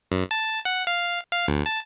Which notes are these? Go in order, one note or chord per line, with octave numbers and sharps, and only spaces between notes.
F#2
A5
F#5
F5
F5
D2
A5